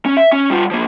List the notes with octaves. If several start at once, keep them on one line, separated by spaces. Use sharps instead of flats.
C#4
E5
C#4
G3 F4
F3 A#3